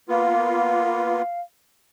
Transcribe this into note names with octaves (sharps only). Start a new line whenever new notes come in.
A#3 B3 F4 F5